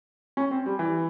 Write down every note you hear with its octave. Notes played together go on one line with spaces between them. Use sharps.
C#4
C4
G3
E3